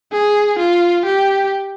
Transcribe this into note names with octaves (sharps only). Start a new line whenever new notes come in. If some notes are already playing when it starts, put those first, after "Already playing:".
G#4
F4
G4